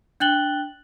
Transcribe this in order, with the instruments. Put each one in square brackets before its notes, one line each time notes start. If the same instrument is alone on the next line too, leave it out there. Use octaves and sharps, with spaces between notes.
[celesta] D4 G5 F#6 A6 F#7 G7